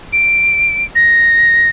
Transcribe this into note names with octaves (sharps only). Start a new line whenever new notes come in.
D7
A#6